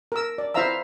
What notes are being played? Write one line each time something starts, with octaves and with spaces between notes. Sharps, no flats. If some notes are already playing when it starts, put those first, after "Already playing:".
A#4 E6
D5
E4 C5 E5 F5 A#5 E6